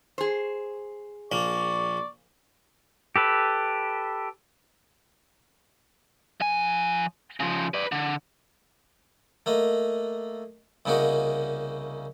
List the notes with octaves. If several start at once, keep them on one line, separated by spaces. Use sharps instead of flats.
G#4 C5
A#1 A#3 D5 C#6
G4 A4 B4
F3 G#5
C#3 F3
B4 D5
D3
A3 A#3 D#5
C2 C#3 A#3 D#4 F#4